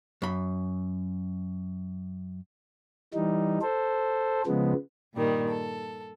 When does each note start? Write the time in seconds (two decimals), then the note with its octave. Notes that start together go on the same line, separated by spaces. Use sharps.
0.22 F#2 B5
3.14 E3 G3 D#4
3.62 A4 C5
4.46 C#3 F3 G#3 B3
5.15 G2 A#2 D#3 G3
5.48 A4